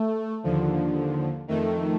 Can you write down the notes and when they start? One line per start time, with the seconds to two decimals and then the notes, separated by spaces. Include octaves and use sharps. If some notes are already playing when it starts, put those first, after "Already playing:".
Already playing: A3
0.43 D#2 D3 F3
1.48 F2 D#3 A3